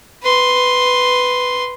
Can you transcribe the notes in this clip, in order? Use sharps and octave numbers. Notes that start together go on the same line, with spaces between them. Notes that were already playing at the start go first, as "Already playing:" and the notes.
B4 C6